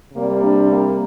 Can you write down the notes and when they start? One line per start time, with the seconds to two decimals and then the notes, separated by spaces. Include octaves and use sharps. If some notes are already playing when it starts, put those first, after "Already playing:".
0.13 C3 G3 A#3
0.43 D4
0.71 A#3